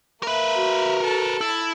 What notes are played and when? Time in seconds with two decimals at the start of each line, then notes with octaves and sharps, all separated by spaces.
0.23 A#3 A#4 B4 E5
0.56 F#4
1.01 A4 A5
1.41 E4 A5